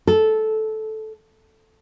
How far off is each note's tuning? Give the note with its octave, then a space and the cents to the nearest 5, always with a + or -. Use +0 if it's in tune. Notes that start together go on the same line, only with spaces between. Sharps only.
A4 -10